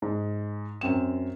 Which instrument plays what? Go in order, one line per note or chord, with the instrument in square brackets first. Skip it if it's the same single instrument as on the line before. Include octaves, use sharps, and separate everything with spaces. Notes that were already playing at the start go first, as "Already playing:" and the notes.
[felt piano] G#2
F#2 C4 E7